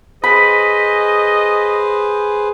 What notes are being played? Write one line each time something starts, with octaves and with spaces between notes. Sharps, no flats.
G#4 B4 C5 D#5 B5